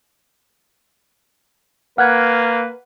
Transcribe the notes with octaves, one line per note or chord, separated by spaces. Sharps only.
A#3 B4 F#5 F6 F#6 G#6